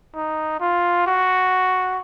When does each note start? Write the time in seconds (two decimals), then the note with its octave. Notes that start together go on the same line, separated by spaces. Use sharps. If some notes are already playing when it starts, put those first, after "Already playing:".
0.15 D#4
0.60 F4
1.06 F#4